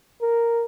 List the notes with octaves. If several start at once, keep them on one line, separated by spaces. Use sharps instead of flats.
A#4